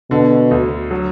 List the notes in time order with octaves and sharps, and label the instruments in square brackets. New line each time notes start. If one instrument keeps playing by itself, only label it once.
[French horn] B2 [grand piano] D3
[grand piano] D2
F#3